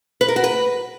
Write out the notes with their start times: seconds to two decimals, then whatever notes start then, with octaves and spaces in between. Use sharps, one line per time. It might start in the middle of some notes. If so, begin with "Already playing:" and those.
0.21 B4
0.28 A#4
0.36 F#4
0.44 B4